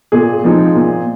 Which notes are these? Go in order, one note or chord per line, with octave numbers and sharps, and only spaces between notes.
A#2 G#4
F3 G#3 C4 D#4
A#2